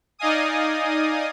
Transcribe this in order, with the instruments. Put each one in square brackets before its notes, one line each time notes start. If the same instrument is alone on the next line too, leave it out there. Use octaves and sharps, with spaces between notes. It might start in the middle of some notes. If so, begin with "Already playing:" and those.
[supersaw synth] D#4 D5 D#5 F5 G#5 D#6